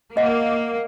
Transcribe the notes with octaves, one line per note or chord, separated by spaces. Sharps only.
A#3 D#5 F#5